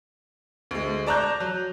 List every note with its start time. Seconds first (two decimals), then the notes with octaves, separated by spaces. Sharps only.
0.71 D2 G#3
1.07 D5 A5 A#5 C#6 F#6 G6
1.40 F#3